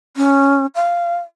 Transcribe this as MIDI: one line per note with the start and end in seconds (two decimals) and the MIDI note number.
0.17 0.66 61
0.75 1.17 77